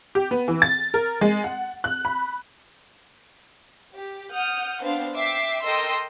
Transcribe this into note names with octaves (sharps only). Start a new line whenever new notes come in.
G4
B3
E3
A6
A#4
G#3
F#5
F#6
B5
G4
F#5 D#6 F6 G6
B3 C4 D4 C5 F5
E5 G5 D6 C7
A4 A#4 D#5 G5 C6 E6